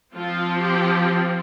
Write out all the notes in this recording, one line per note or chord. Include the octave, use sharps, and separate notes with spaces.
F3 C4 F4
G4